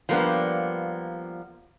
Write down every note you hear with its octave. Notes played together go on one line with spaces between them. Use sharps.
F3 G3 A#3 B3 D4